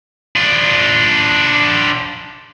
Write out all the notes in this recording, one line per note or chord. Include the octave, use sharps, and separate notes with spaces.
D4 F4